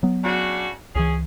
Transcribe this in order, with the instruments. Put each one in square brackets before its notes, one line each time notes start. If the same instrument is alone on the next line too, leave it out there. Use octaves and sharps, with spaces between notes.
[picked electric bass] F#3 B3
[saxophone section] C#3 D4 F#4
[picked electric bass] C#2 E3 [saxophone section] C#4 G#4